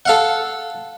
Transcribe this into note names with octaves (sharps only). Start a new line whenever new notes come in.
A4 F5 F#5